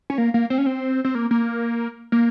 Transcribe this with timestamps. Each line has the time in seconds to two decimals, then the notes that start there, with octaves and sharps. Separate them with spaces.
0.10 C#4
0.18 A#3
0.34 A#3
0.50 C4
0.58 C#4
0.66 C4
1.05 C4
1.15 A#3
1.31 A#3
2.12 A#3